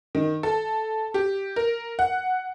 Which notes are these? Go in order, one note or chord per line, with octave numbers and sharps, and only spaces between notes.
D#3
A4
G4
A#4
F#5